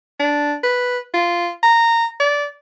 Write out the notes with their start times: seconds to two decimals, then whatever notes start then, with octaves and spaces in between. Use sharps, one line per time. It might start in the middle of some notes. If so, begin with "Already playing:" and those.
0.19 D4
0.63 B4
1.14 F4
1.63 A#5
2.20 D5